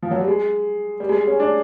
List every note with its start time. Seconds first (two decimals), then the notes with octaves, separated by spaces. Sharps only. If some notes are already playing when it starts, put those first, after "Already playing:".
0.03 F3
0.11 F#3
0.20 G3
0.28 G#3
1.00 G3
1.09 G#3
1.27 C#4
1.40 D4